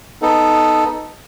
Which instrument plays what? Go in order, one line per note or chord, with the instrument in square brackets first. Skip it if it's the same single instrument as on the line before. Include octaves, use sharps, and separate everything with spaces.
[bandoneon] B3 D#4 A4